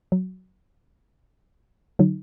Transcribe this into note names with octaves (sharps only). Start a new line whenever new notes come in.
F#3
D3 F#3 D#4